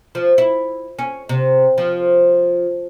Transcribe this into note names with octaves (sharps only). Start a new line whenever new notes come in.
F3
E4
C#4
C3
F3